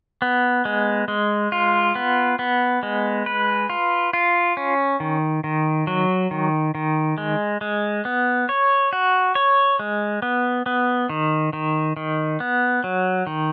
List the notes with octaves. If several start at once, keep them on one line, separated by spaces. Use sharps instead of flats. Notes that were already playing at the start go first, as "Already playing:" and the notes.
B3
G#3
G#3
F4
B3
B3
G#3
B4
F4
F4
C#4
D#3
D#3
F#3
D#3
D#3
G#3
G#3
B3
C#5
F#4
C#5
G#3
B3
B3
D#3
D#3
D#3
B3
F#3
D#3